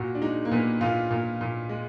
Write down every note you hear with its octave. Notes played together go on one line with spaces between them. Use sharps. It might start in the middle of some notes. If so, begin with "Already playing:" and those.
Already playing: A#2 F#4
D4
G#3 D#4
A#3
A#2 B3
A#2 F4
A#2
A#2
G#3